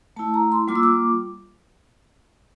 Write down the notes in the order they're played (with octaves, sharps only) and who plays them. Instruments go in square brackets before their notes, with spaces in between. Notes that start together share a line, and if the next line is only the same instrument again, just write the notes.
[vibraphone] A3 E4 A5
A#5
C6
G3 A#3 F4 D6
E6
D6